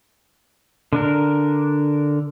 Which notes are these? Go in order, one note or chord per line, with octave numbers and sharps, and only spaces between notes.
D3 D4 A#4